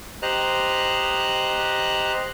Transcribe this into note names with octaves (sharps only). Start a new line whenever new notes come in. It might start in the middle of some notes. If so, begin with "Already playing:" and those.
G4 C5 D#5 A#5 F#6